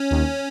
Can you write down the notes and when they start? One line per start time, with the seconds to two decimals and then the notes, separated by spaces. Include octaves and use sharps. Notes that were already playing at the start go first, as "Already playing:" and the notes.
Already playing: C#4
0.11 D#2